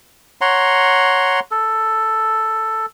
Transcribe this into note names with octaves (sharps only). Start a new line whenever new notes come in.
C#5 F#5 A#5 C6
A4